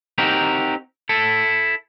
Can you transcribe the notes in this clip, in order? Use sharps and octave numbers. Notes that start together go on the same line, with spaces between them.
C4 D#4 F#4 G4 A#4
E4 A4